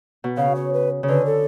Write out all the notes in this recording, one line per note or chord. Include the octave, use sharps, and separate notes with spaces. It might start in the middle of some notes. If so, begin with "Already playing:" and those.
B2
C#3 F5
C#5
B4
C#3
D3 B4
A4